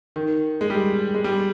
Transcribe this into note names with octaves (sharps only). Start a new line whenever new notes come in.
D#3
G#3
G3
G#3
G3